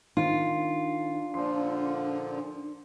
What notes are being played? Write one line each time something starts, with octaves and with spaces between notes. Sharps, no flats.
D#3 D4 F4
A#2 D3 F3 C6